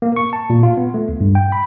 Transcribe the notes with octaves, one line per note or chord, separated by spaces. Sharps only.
A#3
C#6
A5
A#2
F4
B3
A3
D2
G2
G5
B5